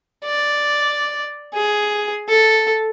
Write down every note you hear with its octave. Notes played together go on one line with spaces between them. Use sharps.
D5
G#4
A4